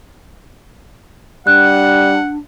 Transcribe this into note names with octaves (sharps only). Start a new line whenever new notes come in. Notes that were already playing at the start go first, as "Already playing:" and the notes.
G3 D4 F#5 F#6